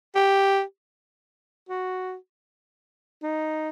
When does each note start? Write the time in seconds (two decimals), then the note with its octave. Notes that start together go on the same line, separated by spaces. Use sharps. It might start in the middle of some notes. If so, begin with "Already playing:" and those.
0.16 G4
1.69 F#4
3.23 D#4